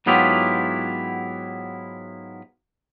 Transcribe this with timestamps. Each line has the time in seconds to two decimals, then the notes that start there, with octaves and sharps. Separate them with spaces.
0.06 G#2 F#3 B3 E4 F4 G4